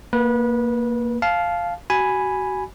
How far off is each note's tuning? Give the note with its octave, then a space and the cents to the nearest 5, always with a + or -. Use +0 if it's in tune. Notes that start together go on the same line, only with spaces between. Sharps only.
A#3 +0 B4 -25
F5 +0 A5 -25
F#4 +30 G#5 +0 B5 +0